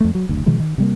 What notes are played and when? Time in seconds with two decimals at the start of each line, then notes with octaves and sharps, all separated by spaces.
0.01 F2 A3
0.15 F#3
0.29 F#1 D2
0.46 B2 D#3 F3 G#3
0.60 D#3
0.78 C3 G3 A#3